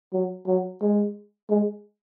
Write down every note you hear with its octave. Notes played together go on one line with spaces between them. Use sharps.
F#3
F#3
G#3
G#3